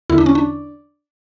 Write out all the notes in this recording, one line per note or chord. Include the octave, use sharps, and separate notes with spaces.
E2 D3 E4
D4
C#4
D4